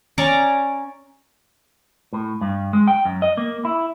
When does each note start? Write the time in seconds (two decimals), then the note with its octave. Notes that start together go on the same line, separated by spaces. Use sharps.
0.18 C#4 D5 A#5
2.13 A2
2.41 G2
2.73 G#3
2.88 G5
3.05 F#2
3.22 D#5
3.37 A#3
3.65 E4